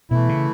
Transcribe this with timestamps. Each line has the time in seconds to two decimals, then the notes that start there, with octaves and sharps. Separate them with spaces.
0.10 B2 E3 A3 E4
0.29 C#3